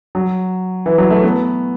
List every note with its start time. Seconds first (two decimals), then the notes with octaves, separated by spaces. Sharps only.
0.15 F#3
0.86 E3
0.98 F#3
1.10 A3
1.24 B3